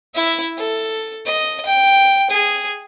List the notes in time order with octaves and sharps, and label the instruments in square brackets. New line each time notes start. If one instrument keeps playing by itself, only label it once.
[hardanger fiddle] E4 E5
A4
D#5
G5
G#4